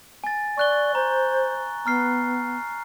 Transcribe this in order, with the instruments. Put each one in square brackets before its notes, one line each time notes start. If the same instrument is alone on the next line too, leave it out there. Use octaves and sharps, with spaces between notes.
[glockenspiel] G#5 A6
[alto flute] D5 [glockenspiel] C#6 F#6 G7
[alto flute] C5 [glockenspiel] A#5
[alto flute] B3 [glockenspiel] A#5 F6 C7